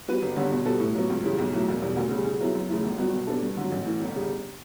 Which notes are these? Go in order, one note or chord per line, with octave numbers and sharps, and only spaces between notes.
G3 B3 F#4 B4
G1
G2 D3 G3 C#4
B2
G3 B3 F#4 A4
A2
F#3 B3
C#2
C#3 E3 G3
B1
A2 F#3 A3
E1
E2 B2 G3
D2
C#3 G3
C#3
F#3 B3 E4
F#2
C#3 E3 A3 E4
G1
G2 F#3 B3 F#4
B2
G3 B3 D4 A4
G2
D3 F#3
A1
A2 E3
G1
C#3 G3